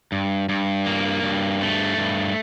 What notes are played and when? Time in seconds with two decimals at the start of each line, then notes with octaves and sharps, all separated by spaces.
0.12 G2
0.49 G2
0.86 A#3
1.23 G2
1.61 A3
1.97 G2